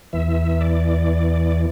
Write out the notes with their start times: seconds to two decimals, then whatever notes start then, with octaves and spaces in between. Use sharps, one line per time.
0.13 E2 E3 E5
0.61 D5